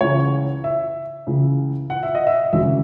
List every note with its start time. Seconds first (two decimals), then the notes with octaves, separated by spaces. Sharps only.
0.01 C#2 C#3 E3 C#5
0.64 E5
1.27 C#2 C#3 E3
1.90 F#5
2.03 E5
2.15 D#5
2.27 E5
2.53 G#1 F#2 C#3 E3 E5